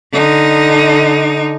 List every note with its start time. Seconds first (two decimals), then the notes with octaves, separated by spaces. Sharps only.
0.13 D3 D#4